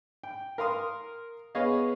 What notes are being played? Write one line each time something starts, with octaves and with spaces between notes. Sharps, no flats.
G5
A#4 F5 C6 D#6
B3 G#4 C#5 D#5 F5